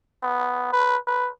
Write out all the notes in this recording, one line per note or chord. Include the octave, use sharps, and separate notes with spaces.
B3
B4
B4